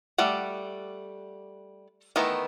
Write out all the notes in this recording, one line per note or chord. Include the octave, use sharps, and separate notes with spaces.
G3 A3 D5 F#5
D#3 E3 A3 B3 A#5